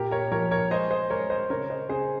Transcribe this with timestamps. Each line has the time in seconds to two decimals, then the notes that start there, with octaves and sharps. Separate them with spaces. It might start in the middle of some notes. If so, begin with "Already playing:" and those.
Already playing: A#2 G4 A#4
0.11 A#4 C#5
0.31 F3 A#4 C#5
0.51 A#4 C#5
0.71 G#3 C5 D#5
0.91 C5 D#5
1.10 G#3 A#4 C#5
1.30 C5 D#5
1.50 C#3 A#4 C#5
1.70 C5 D#5
1.89 C#3 G#4 C5